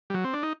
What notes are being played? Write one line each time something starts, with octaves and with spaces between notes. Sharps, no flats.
G3
F#3
C4
D4
D#4